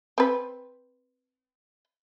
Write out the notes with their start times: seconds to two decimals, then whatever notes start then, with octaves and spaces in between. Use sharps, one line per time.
0.18 C4 B4